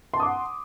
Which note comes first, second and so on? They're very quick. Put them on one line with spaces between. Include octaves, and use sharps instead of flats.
C6 A5 D#6 D6 F#5